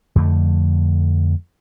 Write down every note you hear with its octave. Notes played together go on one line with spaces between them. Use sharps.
F2 D3 A3